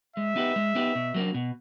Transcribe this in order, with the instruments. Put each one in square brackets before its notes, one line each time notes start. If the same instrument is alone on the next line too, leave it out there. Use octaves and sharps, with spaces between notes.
[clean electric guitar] G#3 [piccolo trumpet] E5
[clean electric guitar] B3 D#4 G4 B4
G#3
B3 D#4 G4 B4
B2
F#3 A#3 D4
B2